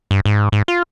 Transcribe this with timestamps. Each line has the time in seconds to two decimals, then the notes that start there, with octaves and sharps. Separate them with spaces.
0.11 G2
0.25 G#2
0.52 G#2
0.68 F4